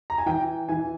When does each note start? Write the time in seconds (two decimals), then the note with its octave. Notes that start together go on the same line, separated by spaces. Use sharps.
0.10 A#5
0.18 G#5
0.26 E3 G5
0.69 E3 G#5